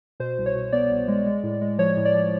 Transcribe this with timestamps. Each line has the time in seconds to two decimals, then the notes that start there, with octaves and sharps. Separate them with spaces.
0.20 B2 C5
0.38 C2
0.46 C#5
0.55 B2
0.72 B3 D5
0.90 C2
1.08 G#3
1.26 G#3
1.43 A2
1.61 G#3
1.78 F3 C#5
1.97 A2
2.05 D5
2.15 F3